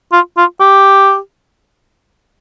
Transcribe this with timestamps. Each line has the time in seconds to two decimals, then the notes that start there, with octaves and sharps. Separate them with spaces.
0.13 F4
0.37 F4
0.60 G4